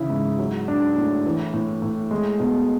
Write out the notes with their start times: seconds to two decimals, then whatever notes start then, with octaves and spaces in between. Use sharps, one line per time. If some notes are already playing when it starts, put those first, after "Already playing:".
Already playing: C#3 E3 E4
0.10 G#2
0.39 F#3
0.68 D4
0.97 A2
1.26 E3
1.54 A2
1.82 A2
2.11 G#3
2.40 B2